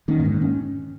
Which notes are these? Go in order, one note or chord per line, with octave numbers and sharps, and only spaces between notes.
D#3 A#3 C#4
A#2
G#2 D#3
C#4